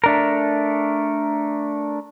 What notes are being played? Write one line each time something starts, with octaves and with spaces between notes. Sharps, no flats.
A3 D4 A#4